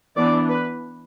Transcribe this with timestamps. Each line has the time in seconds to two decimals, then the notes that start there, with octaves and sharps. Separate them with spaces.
0.16 E3 B3 D4 D5
0.48 B4